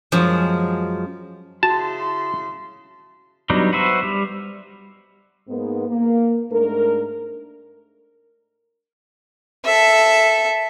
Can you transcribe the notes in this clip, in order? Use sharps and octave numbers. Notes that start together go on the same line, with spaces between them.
F#2 F3 G#3
C#3 E4 F#4 A5 C6
F#3 G3 B3 D4 D#4
F#4 B4 C5 E5
G3
G#2 A#3 B3
A#3
G#2 A3 D4 A#4
A4 E5